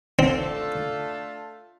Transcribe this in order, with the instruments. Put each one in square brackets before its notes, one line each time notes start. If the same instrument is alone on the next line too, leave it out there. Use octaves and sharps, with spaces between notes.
[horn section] A3 D4 F4 A4 [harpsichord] C4